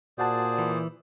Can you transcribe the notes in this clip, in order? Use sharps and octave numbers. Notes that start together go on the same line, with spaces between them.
A#2 F#4 G#4 C5 D5 F#5 A5
E3